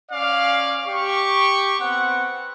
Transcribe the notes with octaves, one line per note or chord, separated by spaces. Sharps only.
C#4 D5 F5
G4 C#6
B3 C4 F#5